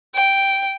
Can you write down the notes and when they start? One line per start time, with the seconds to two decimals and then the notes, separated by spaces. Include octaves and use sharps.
0.15 G5